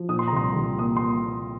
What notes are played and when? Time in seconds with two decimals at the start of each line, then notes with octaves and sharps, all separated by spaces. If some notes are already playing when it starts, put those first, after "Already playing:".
Already playing: F3
0.09 A#2 D#6
0.19 C6
0.28 A#5
0.33 C2 C6
0.56 C2
0.78 A#3 D#6
0.97 C6
1.02 A#3